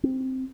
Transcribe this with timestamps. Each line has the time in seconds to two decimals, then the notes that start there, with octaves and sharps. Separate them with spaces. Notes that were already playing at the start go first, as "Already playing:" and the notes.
0.03 C4